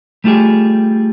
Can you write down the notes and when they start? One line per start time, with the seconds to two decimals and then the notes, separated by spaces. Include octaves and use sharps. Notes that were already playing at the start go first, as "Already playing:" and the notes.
0.24 G3 A3 F4 G4 G#4